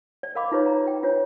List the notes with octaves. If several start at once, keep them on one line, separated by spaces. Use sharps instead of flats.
D5
A#4 D5 D#5 F5 B5 D6
D#4 F4 G4 B4 C#5 C#6
A#5
G5
D4 F4 B4 C#5